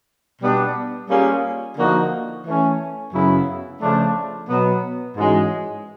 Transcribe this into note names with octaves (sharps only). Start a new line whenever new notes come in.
B2 G3 B3 D4
G3 A#3 C#4 F4 G#4
D3 F3 A#3 D#4 F#4
E3 A3 C#4
F#2 C#3 F#3 B3 E4
C#3 F3 A3 D4
B2 F#3 B3
G#2 E3 G#3 C#4 F#4